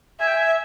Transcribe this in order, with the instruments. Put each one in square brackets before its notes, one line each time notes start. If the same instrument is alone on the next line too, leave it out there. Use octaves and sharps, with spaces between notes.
[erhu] E5 [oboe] G#5
[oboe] G5
G#5